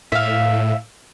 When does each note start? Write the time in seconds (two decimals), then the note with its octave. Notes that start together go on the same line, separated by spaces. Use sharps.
0.12 A2 E5 F5